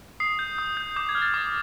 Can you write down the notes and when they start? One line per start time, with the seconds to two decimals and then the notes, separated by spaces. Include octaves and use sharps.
0.20 D#6 C7
0.39 G6
0.58 D#6
0.77 G6
0.96 D6 G6
1.09 G#6
1.15 F6
1.22 A6
1.34 D6